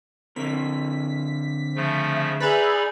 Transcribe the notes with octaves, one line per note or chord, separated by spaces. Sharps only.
D3 C4 A#4 B6
C#3 F3 A3 E5
D#4 G#4 B4 D5 E5 B5